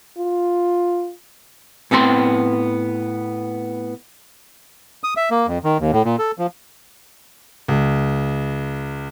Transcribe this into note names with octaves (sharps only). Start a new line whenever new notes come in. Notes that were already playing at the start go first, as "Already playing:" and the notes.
F4
A2 B3 C4 A#5 C6
D#6
E5
A#3
F2
D#3
D#2
A2
A#2
A4
F3
C#2